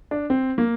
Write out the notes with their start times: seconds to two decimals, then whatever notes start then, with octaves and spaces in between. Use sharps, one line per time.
0.11 D4
0.30 C4
0.58 A#3